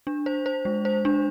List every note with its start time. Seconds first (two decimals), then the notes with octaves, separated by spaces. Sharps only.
0.07 D4
0.26 C5
0.46 C5
0.65 G#3
0.85 C5
1.05 D4